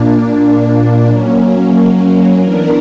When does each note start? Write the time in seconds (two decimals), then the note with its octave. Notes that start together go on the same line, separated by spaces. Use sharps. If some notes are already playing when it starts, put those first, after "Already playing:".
Already playing: A#2 A#3 D4
1.09 F#3 A#3 C#4
2.39 E3 B3 D4 A#4